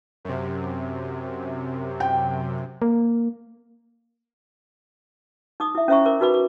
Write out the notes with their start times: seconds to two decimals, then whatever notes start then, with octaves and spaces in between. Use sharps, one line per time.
0.25 F#2 C3
2.00 G5
2.82 A#3
5.60 D#4 D6 D#6
5.75 E4 E5
5.88 C#4 C5 E5 A#5 C#6
6.06 A#4 D6
6.20 D#4 F#4 B4 B5 D6
6.34 D6